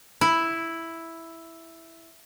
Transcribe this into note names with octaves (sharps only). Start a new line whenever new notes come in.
E4